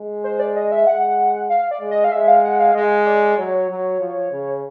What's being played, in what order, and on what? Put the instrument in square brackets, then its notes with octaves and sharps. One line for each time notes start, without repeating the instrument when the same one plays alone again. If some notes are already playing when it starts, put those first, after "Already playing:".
Already playing: [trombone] G#3
[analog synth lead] C5
D5
D#5
E5
[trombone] G#3 [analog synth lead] F#5
[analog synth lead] F5
D5
[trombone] G#3
[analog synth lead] D#5
F5
[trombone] G#3 [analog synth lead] E5
[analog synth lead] F5
F#5
F5
[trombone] G#3 [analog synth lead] D#5
[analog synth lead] D5
[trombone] F#3 [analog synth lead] C#5
[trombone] F#3
F3
C#3